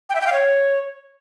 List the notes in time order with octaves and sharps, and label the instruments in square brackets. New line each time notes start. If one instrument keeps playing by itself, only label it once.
[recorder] G5
E5
G5
F5
C#5